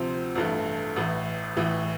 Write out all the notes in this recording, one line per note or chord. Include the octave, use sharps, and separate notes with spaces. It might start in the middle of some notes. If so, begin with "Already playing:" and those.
Already playing: D2 C3 F3 C4
A1 G2 E3 A3
A1 A2 E3
A1 A2 E3